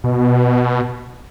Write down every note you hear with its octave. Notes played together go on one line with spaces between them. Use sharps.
B2